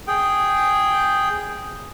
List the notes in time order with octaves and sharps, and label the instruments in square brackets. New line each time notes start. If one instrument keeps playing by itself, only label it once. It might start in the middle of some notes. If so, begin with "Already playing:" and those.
[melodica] G#4 G5